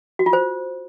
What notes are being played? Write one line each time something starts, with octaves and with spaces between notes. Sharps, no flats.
F#4
F4
C5